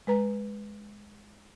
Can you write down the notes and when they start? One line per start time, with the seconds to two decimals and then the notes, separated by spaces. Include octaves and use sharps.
0.07 G#3 B4 A#5